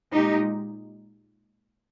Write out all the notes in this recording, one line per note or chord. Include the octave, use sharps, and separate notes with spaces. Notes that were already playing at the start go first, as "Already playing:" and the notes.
A#2 G#3 D#4 G4